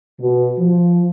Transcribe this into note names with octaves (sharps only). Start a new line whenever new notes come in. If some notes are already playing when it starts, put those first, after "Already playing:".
B2
F3